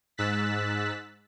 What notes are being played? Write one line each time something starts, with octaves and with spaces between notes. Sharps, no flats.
G#2 E6 F#6 A6 B6